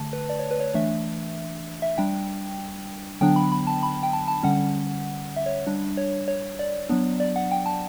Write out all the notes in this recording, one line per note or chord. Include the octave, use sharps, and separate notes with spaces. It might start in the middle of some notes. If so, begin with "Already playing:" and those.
Already playing: D3 A3 A5
B4
D5
C#5
B4
C#5
E3 A3 D4 E5
E5
G3 D4 G5
D3 F#3 B3 D4 G5
B5
B5
A5
B5
G5
A5
A5
D3 G3 C#4 F#5
E5
C#5
G3 D4
C#5
C#5
D5
F#3 B3 D4
D5
F#5
G5
A5